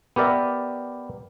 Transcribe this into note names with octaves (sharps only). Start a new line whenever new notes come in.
B3 G4 A#4 D5 E5